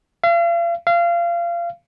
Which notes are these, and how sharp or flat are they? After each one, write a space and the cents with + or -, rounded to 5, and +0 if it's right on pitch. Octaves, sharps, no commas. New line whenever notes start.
F5 -40
F5 -25